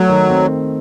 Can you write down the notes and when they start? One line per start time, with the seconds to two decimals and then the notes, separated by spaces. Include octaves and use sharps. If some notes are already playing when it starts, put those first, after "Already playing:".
Already playing: F#3 A3
0.09 D#3
0.30 C4